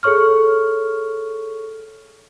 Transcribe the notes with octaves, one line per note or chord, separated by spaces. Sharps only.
G#4 A4 C#5 C#6 F6